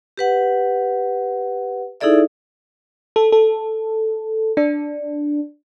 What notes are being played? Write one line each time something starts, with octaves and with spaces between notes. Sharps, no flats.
G4 B4 F#5
D#4 E4 G#4 A4 D5 E5
A4
A4
D4